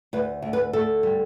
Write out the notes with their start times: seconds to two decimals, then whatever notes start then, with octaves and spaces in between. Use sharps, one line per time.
0.13 D2 B4
0.42 D2
0.53 B4
0.73 D2 A4
1.03 G3